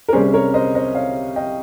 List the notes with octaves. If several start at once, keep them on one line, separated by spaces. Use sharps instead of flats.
A#4
C2 C3 G3 C#4 G#4 C5
A#4 C#5
C5 D#5
C5 D#5
C#5 F5
D#5 G5